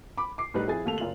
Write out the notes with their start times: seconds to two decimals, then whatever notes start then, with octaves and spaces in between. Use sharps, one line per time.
0.18 B5 D6
0.38 D6 C7
0.54 A2 G3 D#4 B4 F#6
0.67 F2 E4 G#4 G#5 A6
0.86 D#2 A3 F7
0.98 F#1 F4 F#7